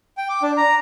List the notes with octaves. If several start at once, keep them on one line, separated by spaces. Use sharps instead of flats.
G5
D6
D4
A#5